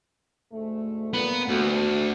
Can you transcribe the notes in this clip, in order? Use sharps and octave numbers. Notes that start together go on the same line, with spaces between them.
D2 G#2 A3
A#2 B3
D2 A3 F#4